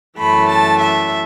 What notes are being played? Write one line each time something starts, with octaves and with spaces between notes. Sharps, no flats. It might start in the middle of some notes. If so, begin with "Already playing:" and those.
F#2 E3 A3 B5
A5
E5